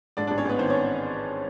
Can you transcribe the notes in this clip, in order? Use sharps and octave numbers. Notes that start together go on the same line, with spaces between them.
G#2 D4 D5
A1 D4 D5
C#4 C#5
A1 B3 B4
D#3 C4 C5
C#4 C#5